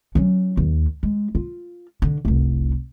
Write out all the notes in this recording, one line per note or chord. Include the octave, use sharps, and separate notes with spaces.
F#3 C#4
D#2
G#3
F4
D3
F1 C2